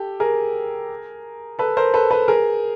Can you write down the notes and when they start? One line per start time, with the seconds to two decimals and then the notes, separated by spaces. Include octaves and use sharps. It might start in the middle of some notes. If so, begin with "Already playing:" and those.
Already playing: G4 A4
0.20 G#4 A#4
1.59 A4 B4
1.77 A#4 C5
1.94 A4 B4
2.11 A4 B4
2.28 G#4 A#4